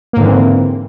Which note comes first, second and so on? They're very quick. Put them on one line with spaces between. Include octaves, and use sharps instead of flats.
A#3 G#2 D3 E3 C4